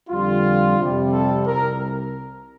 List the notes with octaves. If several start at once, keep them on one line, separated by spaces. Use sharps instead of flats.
F2 D3 G3 F4
F2 C3 G3
A4
C2 A#4